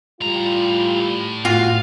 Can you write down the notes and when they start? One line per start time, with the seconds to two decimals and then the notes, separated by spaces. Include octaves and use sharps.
0.21 A2 G3 F4 A#5
1.45 A2 F4 F#4 F5